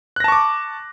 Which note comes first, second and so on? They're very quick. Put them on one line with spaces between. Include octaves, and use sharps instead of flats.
F#6 A#6 A5 C#6 D6